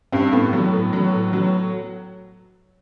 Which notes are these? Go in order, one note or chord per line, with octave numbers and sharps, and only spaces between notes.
G2 C4
A2 B3
F#3
A2
F#3
A2
F#3